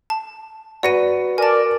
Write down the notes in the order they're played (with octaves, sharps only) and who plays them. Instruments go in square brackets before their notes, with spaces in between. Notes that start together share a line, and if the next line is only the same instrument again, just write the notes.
[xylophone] A5
[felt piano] F#4 B4 C#7 [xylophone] D5 A#6 D#7
[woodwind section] A#4 D5 [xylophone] G#5 A5